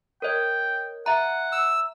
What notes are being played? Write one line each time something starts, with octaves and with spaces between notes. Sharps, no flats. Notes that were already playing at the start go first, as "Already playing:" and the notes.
A#4 C#5 D#5 G5
E5 F#5 A#5
E6